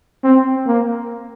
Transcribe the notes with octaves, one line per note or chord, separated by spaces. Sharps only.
C4
A#3